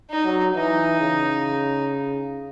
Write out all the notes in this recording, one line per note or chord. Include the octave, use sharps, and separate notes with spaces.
D#4
F#3
E3 D#4
C#3